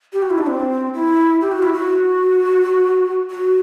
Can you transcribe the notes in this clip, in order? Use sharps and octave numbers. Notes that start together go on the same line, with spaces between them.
G4
F#4
E4
D4
C4
E4
G4
F#4
E4
F#4
F#4